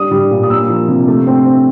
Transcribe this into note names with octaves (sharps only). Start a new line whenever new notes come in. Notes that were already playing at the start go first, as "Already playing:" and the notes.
Already playing: G3 D4 D#6
G3
A#2
D#6
A#3 E6
F3
C3
A3
C4
C4